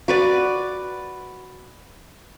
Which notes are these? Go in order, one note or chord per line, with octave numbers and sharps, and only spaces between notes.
F#4 B4 D5